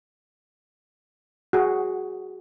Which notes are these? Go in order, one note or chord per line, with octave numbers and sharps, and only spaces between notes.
F#4 G#4